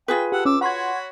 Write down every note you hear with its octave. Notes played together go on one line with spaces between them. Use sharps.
F4 G#4 B4 G5
G4 A4 F#5
C#4 D6 E6
F#4 C#5 F#5 B5 C6 G#6